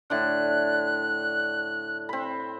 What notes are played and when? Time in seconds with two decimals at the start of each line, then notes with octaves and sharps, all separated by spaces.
0.10 A2 D3 F#6
2.09 C4 B5